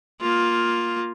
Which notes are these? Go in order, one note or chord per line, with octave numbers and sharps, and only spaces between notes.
A#3 F4